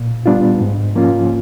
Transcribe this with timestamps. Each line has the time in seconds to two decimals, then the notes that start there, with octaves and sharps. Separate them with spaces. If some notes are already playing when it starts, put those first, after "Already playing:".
Already playing: A#2
0.26 G3 B3 D4 F4
0.60 G#2
0.95 F3 A#3 C#4 F4